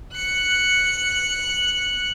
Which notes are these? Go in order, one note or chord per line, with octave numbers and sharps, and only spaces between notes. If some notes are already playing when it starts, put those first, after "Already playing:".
F#6 C#7